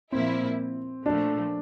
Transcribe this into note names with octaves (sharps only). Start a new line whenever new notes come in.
A#2 F3 A#3 C4 E4
A#2 F3 A3 D4